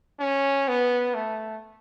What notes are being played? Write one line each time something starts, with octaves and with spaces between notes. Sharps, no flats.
C#4
B3
A3